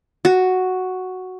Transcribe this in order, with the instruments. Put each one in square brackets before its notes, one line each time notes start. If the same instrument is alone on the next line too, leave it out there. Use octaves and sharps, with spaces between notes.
[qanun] F#4